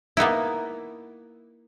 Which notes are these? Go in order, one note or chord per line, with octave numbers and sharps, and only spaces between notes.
A#3 B3 D#4 E4